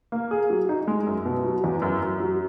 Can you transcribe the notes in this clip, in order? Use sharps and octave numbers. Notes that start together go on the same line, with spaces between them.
A#3
G#4
F#3
D#4
G#3
F#2
B2
F#3
E2
F#2
F#2
F#3